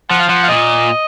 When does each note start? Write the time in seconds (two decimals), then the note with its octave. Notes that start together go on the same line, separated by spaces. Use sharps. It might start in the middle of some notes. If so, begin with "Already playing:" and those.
0.10 F3 F#5
0.20 F5
0.29 F3 F#5
0.43 F5
0.48 A#2 D#5